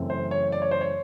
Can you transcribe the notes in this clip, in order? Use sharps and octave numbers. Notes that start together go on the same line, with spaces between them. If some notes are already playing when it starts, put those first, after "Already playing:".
Already playing: F#2 C#3 E3 A3 C4
C5
C#5
D5
C#5
C5
C#5